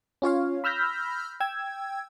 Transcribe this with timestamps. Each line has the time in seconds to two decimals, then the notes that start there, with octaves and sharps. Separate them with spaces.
0.22 C#4 F4 C#5 F5
0.64 B5 E6 F6 G6 A#6 B6
1.40 G5 E6 G#6